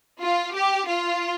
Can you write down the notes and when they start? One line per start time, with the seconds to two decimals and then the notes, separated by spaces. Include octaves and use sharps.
0.21 F4
0.54 G4
0.87 F4